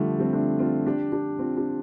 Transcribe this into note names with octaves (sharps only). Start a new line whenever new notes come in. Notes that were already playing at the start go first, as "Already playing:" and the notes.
Already playing: D3 F3 G3 A3
G3 C4
A3 D4
C4 F4
D4 G4
D4 G4
C4 F4
D4 G4